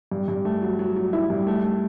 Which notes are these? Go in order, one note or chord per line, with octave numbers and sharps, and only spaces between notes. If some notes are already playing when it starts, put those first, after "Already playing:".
G2
G2
A3
F#3
F#3
F#3
E4
G2
A3
A3